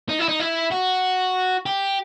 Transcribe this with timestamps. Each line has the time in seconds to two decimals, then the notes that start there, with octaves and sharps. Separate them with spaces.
0.09 D#4
0.19 E4
0.28 D#4
0.40 E4
0.72 F#4
1.66 G4